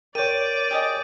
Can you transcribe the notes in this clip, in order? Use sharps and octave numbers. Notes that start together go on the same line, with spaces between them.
G4 A#4 C#5 D5 D6 G6 D#7
G4 G#4 D#5